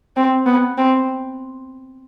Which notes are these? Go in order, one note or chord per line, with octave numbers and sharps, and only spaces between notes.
C4
B3
C4